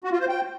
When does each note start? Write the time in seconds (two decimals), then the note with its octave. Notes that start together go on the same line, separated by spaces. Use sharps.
0.04 F#4
0.12 F4
0.20 C5
0.29 G5